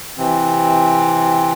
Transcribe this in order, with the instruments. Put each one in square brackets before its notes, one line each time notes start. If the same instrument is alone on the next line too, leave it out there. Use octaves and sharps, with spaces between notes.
[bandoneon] C3 E3 C4